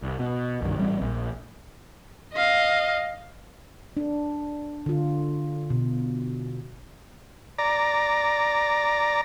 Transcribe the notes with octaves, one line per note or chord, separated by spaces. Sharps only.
C2
B2
C2 G2 D#3
A1 G3 C4
A#1 A#2
D#5 F5
D4
D3 F4
B2
D5 A#5